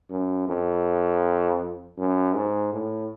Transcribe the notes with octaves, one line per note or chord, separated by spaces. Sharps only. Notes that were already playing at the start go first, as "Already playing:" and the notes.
F#2
F2
F#2
G#2
A2